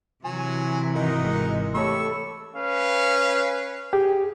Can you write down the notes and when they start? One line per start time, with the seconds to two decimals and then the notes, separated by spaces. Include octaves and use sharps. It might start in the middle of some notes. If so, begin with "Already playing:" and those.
0.24 C3 E3 F#3 G#5
0.94 G#1 D#4 F#4 A#4 D#5
1.24 G#3
1.74 A3 G4 A4 C#5 B5 C#6 E6
2.55 C#4 B4 F5
3.93 G4 G#4